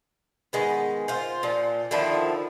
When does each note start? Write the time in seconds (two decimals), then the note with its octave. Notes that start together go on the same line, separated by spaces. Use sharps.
0.53 D#3 G#3 B3
1.08 F4 C5
1.43 A#2 F3
1.91 D3 D#3 F3 E4